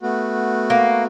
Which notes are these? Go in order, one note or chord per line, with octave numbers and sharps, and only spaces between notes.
A3 B3 F#4
A#3